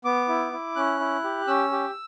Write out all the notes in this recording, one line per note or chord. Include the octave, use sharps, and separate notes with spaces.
B3 D6
E4
E4
C#4 F#6
E4
G4
C#4 E6
G4